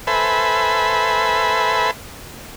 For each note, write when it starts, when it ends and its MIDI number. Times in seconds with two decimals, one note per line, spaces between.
0.07 1.91 69
0.07 1.91 71
0.07 1.91 72
0.07 1.91 76
0.07 1.91 80
0.07 1.91 83